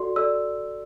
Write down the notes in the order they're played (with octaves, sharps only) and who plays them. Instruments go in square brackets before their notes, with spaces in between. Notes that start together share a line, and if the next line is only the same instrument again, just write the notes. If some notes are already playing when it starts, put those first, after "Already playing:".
Already playing: [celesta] F#4 A4 D5 C6
A4 D5 E6